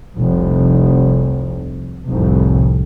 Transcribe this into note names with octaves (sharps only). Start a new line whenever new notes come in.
F1 C2
F1 C2 F2 A2